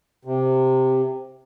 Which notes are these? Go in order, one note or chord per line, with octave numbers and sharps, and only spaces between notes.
C3